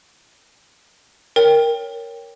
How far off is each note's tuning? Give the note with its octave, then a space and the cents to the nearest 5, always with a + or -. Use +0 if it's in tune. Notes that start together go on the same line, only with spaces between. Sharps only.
A#4 +0 C#5 +0 G5 +10